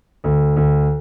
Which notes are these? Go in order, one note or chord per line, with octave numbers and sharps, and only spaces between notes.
D2
D2